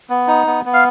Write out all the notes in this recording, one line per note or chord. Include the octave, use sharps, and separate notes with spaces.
B3
D#4
B3
B3
F5